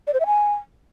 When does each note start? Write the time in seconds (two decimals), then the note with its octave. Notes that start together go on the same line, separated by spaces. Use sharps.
0.07 D5
0.14 C5
0.20 E5
0.26 G#5